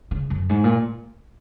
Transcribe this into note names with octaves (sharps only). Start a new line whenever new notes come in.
C#3
F#2
G#2
A#2